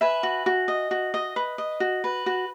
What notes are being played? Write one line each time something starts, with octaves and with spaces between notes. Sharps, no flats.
B4 E5 G#5
F#4
F#4
D#5
F#4
D#5
B4
D#5
F#4
B4
F#4